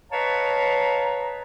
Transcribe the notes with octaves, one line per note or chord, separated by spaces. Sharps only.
B4 C#5 D#5 F5 A5 A#5